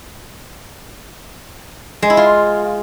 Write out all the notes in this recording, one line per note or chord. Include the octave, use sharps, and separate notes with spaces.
G#3
E4
F4